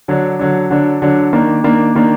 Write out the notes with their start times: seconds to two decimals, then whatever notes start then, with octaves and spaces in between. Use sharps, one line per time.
0.08 D3 F#3 D4
0.39 D3 F#3 D4
0.70 D3 F#3 D4
1.02 D3 F#3 D4
1.33 D#3 A#3 D4
1.64 D#3 A#3 D4
1.95 D#3 A#3 D4